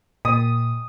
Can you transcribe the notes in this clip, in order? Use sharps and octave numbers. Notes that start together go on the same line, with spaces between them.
A#2 D#6